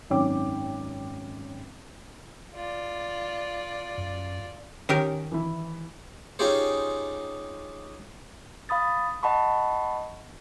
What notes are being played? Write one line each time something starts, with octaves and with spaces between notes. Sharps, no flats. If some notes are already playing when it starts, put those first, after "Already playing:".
G#1 F#2 D#3 C#4 G5 D6
F4 D5
F#2
D#3 C#4 G4 A#4
E3 E4
C#4 D#4 F4 G4 G#4 C5
F5 B5 D#6 A6
D#5 F#5 A5 B5 C#6